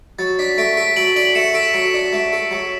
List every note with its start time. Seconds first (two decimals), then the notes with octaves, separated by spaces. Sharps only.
0.19 F#3 A6
0.39 D4 B6
0.58 A3 B6 D7
0.77 A4 B6 D7
0.96 F#3 D7 F#7
1.16 D4 D7 F#7
1.35 A3 C#7 E7
1.54 A4 B6 D7
1.74 F#3 B6 D7
1.94 D4
2.13 A3
2.33 A4
2.51 F#3